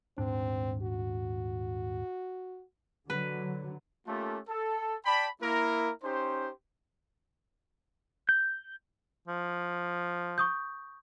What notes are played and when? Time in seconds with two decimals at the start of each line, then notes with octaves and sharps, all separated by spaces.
0.18 D#1 G#2 C4 D4
0.82 F#4
3.10 D3 F#3 B4
4.07 A3 A#3 C#4 F4 G4 A4
4.48 A4
5.05 D5 G5 A5 B5
5.42 A#3 E4 A#4
6.03 C#4 D#4 G4 C5
8.29 G6
9.28 F3
10.38 C#6 D#6 G6